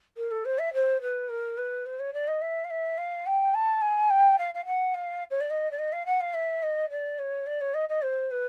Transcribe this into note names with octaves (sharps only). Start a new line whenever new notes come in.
A#4
A4
C5
E5
C5
B4
A#4
B4
C5
C#5
D5
D#5
E5
F5
E5
F5
G5
A5
G#5
G5
F5
F5
F#5
F5
C#5
D5
D#5
D5
D#5
F5
F#5
F5
E5
D#5
D5
C#5
D5
C#5
D#5
D#5
C5
B4